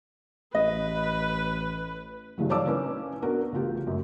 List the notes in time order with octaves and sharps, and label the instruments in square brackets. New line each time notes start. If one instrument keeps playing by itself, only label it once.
[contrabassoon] A1 [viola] B4 [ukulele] D#5
[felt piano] G2 C#3 E3 F#3
C#5 D5 F5 A5 D6 E6
C#4 D#4 E4 B4
B3 D4 F#4 A#4
A1 C#3 F4 G4
F#2 A2